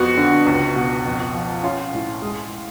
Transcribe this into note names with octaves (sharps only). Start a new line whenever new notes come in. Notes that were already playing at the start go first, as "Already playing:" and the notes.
Already playing: F2 B3 F#4
D3
C#2
B2
F2
F3
C#4 F4
A2
G#3